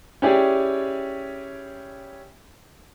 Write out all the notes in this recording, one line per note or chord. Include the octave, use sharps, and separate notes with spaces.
C#4 E4 G4 G#4 D5